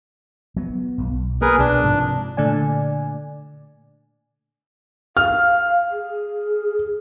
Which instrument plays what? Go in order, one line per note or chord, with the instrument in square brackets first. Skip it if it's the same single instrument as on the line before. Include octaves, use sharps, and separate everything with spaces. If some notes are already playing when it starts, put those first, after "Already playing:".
[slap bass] F#3 B3
E1 B1
[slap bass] A#3 [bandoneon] G#4 A#4 B4
[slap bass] B1 B2 [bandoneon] D4
[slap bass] G#2 C3 F3
[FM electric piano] A#2 D3 A3 D5 G#5
[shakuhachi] F5 [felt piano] F6
[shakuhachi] G#4